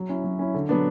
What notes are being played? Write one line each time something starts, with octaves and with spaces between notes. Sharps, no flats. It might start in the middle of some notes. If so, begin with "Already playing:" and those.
Already playing: F#3
C#4 E4
F#3
C#4 E4
D3
F#3 B3 D4